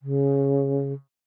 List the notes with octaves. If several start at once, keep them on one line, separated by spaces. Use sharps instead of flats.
C#3